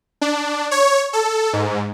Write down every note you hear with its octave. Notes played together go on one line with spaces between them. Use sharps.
D4
C#5
A4
G#2